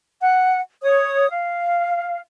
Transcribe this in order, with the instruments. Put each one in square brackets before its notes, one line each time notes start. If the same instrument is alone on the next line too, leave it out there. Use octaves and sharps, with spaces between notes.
[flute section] F#5
C#5 D#6
F5